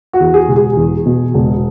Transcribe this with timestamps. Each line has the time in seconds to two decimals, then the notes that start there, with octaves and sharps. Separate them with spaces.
0.13 F#4
0.20 E2
0.34 G#4
0.48 E1
0.56 G#4
0.77 E2
1.06 B2
1.34 E1